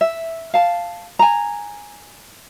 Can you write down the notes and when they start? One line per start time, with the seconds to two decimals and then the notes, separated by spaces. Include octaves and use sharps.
0.01 E5
0.54 F5 A5
1.19 G#5 A#5